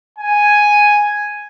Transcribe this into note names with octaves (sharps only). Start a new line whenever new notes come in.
G#5